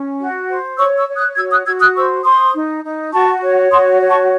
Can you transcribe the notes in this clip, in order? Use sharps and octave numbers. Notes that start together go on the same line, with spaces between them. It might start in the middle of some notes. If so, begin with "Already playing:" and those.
Already playing: C#4
F#4
C5
C#5 C#6 E6
C#6 E6
C#5
D#6 F#6
F#4 E6 G#6
D#6 F#6
F#4 E6 G#6
D#6 F#6
C5 C#6 E6
C5 C6 D#6
D#4
D#4
F#4 A5 C#6
C#5
F#4 C6 D#6
C#5
A5 C#6